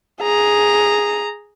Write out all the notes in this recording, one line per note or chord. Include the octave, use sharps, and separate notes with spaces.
G#4 A#5